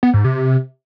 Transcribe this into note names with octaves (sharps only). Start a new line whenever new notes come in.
B3
G#2
C3